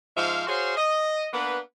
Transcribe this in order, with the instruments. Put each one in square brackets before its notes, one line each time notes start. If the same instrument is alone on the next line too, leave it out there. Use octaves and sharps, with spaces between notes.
[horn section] G#2 F3 C5 E5 F5
F#4 G#4 C5 C#5 F5 C6
D#5
A#3 B3 D4 B4